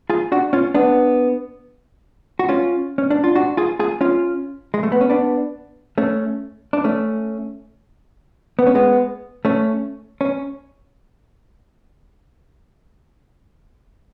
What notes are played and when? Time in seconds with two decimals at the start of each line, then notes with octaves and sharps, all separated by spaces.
0.10 F4 G#4
0.32 D4 F#4
0.53 C#4 F4
0.74 B3 D4
2.39 F#4
2.49 C#4 F4
2.98 C#4
3.11 D4
3.24 F4
3.35 D4 F#4
3.57 F4 G#4
3.79 F4 G#4
4.01 C#4 F4
4.74 G#3
4.83 A3
4.92 B3
5.01 C#4
5.09 B3 D4
5.98 A3 C#4
6.73 D4
6.84 A3 C#4
8.59 B3
8.67 C#4
8.75 G#3 B3
9.45 A3 C#4
10.21 C#4